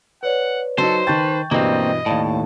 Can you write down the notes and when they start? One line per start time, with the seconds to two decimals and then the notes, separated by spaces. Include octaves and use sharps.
0.23 B4 C#5 D5 F#5
0.78 F#3 D#4 A4 C5
1.07 D#3 B4 G5 A5 C#6 G6 A6
1.51 G2 B2 E3 A#3 C4 D#5
2.06 D#2 A2 D5 F5 A5